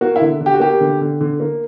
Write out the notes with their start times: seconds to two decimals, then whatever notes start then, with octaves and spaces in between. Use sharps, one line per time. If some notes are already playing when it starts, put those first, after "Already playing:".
0.01 A#3 F#4
0.16 E4
0.21 D3
0.41 D3
0.46 G4
0.54 F#4
0.60 A#3 G4
0.81 D3
1.01 D3
1.21 D3
1.40 A#3